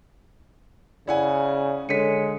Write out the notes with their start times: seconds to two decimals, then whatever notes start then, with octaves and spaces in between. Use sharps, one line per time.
1.07 C#3 E4 D5 F#5 G#5
1.89 D3 G#3 C#5 B6 C#7 D#7